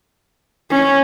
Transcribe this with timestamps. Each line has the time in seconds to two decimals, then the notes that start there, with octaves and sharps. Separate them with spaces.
0.71 C#4